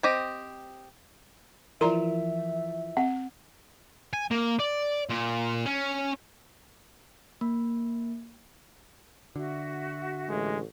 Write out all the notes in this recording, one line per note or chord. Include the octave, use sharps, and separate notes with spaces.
C4 G4 D#5
E3 F3 A#4 D5 E5 A#5 C6
C4 F#5
G#5
A#3
D5
A#2
C#4
A#3
D3 F#4 E5
A1 G#3